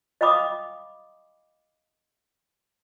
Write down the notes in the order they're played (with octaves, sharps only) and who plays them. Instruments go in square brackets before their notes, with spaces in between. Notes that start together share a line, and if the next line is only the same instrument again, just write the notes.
[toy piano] D#5 F5 G5 B5 D6 D#6